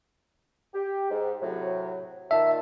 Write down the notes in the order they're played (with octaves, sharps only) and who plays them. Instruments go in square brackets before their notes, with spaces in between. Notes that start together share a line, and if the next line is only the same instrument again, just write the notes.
[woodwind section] G4
G#2
A2 C3 F#3
[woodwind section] A#2 D#3 A5 [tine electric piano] E5